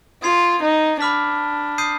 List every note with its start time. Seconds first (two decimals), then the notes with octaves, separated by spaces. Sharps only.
0.22 F4 D#6 G#6 C7 F7
0.62 D#4
1.00 D4 B5 D6 F6 B6
1.78 D#6 G6 C7 D#7